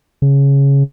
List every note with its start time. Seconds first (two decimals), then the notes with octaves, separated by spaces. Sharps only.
0.22 C#3